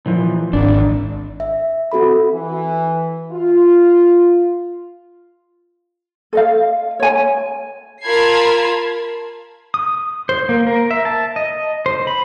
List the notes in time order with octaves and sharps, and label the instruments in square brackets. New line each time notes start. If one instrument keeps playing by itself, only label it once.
[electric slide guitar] A#2 E3 F3
[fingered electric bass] G#1 [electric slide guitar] D4
[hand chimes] E5
C4 F#4 A4 B5
[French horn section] E3
F4
[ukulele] A4 D#5 F5
C#5 G#5
[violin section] F4 A#4 A5 B5 G#6 C7
[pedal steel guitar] D#6
C5
A#3
A#4
E5
A5
D#5
C5
B5